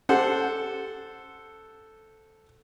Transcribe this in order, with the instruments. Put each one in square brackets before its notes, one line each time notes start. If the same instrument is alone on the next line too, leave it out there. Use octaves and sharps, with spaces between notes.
[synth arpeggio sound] C#4 G4 [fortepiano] A4 C5 F#5